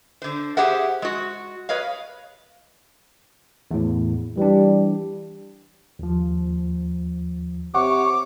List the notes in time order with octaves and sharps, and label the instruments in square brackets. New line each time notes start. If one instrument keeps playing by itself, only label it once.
[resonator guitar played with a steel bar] D3 C5
G4 G#4 C5 E5 F#5
G#3 F#4
B4 C#5 D#5 F5
[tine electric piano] E2 A2
[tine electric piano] E3 D4 [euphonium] G3
[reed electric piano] D#2 F3
[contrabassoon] C3 [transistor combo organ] C#5 [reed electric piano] F#5 [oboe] D6